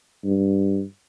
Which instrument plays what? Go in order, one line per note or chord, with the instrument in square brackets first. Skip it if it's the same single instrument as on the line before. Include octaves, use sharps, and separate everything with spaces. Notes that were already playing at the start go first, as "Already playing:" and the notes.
[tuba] G2